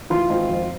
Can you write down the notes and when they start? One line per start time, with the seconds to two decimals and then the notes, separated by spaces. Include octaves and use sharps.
0.10 E3 F4
0.30 G#1
0.49 F2